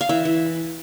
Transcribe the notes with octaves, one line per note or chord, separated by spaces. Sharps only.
F5
E3 E5
E3